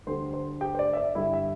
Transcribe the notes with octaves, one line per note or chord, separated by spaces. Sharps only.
D2 D3 G3 C5 C6
C5 C6
G4 G5
C5
D5
E5
D5
G2 D3 G3 E4 E5
E5